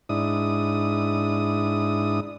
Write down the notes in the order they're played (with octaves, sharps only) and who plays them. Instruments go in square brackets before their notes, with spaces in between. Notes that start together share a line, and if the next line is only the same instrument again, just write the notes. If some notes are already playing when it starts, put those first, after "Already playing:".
[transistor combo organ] G#2 D4 E4 D#6